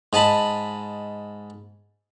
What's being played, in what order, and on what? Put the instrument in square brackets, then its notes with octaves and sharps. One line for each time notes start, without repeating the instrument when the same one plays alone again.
[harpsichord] G#2 D#5 A5 B5